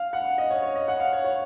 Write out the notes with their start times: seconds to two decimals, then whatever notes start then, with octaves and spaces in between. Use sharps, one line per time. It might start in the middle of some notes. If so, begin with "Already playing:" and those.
Already playing: F5
0.13 F#5
0.38 D#5
0.50 C#5
0.62 C#5
0.76 D#5
0.88 F#5
1.00 F5
1.13 C#5
1.24 C#5